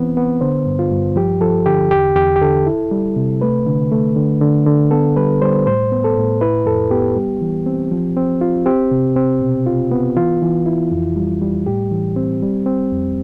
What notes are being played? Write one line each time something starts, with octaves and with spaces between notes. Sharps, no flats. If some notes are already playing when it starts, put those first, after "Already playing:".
Already playing: E3 B3 C4
B3
D3 C5
G2
F4
G2
F3 G4
F3 A4
D3 G4
E2 G4
E2 G4
G4
D3 A4
E4
G3
C3
A3 B4
D3
A3
D3
D3
D3
B3 A4
G3 B4
G3 C5
A2 C5
B3
A4
A2
E4 B4
F2 A4
B3 G4
G3
E3
C4
F3
C4
F4
C4 G4
C3
C4
B2
F4
B3
E3 F4
E3
E4
F2
G3
G3
A2 G4
E3
C4
G3
C4
F2